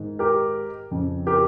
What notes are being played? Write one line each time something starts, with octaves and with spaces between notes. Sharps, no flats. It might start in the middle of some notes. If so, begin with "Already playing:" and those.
Already playing: G#2 D#3
G4 A#4
F2 C#3
G4 A#4